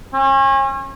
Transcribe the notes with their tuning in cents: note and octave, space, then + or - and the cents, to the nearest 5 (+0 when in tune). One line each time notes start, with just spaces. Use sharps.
C#4 -35